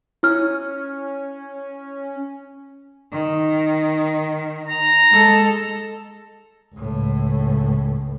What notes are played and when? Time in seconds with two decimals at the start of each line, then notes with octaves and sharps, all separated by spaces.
0.23 C#4 E4 F6
3.12 D#3
4.68 A#5
5.11 G#3 A4
6.74 C#2 A2